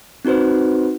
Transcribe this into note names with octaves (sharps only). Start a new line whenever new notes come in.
C4 D#4 F#4 B4 C5